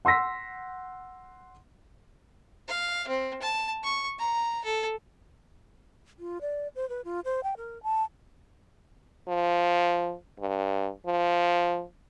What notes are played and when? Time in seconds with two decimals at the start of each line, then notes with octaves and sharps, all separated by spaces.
0.05 F#5 C6 E6 A#6 B6
2.68 F5
3.07 C4
3.42 A5
3.83 C#6
4.19 A#5
4.64 A4
6.19 F4
6.41 D5
6.76 C5
6.89 B4
7.05 F4
7.25 C5
7.44 G5
7.57 A#4
7.83 A5
9.28 F3
10.40 G2
11.07 F3